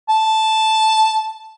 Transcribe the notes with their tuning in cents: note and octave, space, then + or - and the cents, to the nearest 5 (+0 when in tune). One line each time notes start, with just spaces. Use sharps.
A5 -5